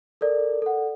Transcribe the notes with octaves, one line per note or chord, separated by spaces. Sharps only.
A4 A#4 D5
A4 F#5